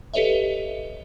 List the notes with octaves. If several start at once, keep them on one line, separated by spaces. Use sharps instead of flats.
G4 A4 B4 C#5 D#5 E5